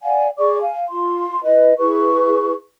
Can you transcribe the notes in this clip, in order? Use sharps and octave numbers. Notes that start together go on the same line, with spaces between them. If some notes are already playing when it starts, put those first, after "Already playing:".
D5 F5 F#5 G#5
G#4 D5 C#6 D6
F5 G#5
F4 C6
E4 B4 D#5
E4 G#4 B4 C#6